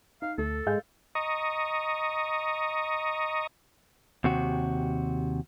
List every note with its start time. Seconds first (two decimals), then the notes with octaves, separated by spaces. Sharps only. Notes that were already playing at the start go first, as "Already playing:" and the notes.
0.22 D#4 F5
0.38 D2 A3 A4
0.67 G#2 G#3 F5 G6
1.15 D#5 A#5 C#6 D#6
4.24 D#2 C3 F#4